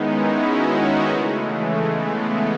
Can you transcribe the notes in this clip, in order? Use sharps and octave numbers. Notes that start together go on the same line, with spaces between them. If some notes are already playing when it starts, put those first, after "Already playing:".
Already playing: D#3 G#3 B3 C#4 D#4 E4
D#4 F#4
C#3 E3 G#3 A3
B3